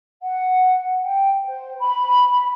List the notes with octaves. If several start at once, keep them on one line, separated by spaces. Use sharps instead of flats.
F#5
G5
C5
B5